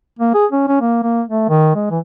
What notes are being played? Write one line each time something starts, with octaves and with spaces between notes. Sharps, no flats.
A#3
G#4
C#4
C#4
A#3
A#3
A3
D#3
G#3
E3